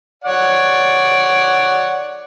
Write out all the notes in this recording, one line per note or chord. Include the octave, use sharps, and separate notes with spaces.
C#5 D5 F#5